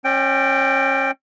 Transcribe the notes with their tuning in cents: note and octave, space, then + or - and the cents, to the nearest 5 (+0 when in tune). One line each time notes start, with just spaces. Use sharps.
C#4 -30 D5 +40 G5 +0